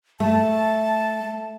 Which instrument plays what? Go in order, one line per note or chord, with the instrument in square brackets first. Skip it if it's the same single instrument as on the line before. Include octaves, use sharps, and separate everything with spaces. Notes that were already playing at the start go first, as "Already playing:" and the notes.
[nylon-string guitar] A3 [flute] A5